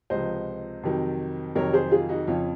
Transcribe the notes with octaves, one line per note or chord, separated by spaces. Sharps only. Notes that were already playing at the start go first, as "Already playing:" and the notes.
C#2 C3 F3 C5 D#5
F2 C3 D#3 F#3
F2 C3 D#3 F#3 A#4 C#5
G#4 C5
F4 G#4
D#4 F#4
F2 C#3 F3 C#4 F4